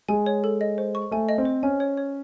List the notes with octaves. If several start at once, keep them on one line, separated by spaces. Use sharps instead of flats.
G#3 G#5
C#5
A4
D#5
C5
C#6
A3 G#5
D#5
C4
C5
C#4 G#5
C#5
C#5